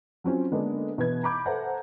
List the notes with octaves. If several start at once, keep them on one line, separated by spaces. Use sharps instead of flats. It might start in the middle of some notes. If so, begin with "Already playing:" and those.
F#3 C4 C#4 F4
D3 G#3 A#3 B3 D4
B2 E3 B4 G#6
A#5 B5 D6 G6
A4 B4 C5 E5 F#5 A#5